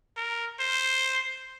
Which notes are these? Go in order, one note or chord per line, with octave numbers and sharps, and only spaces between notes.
A#4
C5